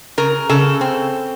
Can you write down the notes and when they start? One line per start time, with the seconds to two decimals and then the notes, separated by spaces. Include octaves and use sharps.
0.18 C#3 A#4
0.49 C#3 A4
0.81 C4